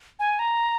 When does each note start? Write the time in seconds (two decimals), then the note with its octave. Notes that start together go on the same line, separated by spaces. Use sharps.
0.19 G#5
0.39 A#5